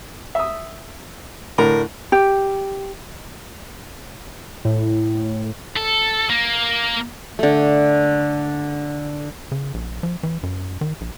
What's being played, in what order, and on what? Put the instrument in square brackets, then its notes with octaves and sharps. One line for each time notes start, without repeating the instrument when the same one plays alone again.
[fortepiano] E5 D#6
[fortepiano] A2 D3 [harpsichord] A#4
[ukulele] G4
[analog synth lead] A2
[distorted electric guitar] A4
A#3
[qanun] D3 A3
[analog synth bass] C#3
A#1
F3
E3
F#2
D#3
A#1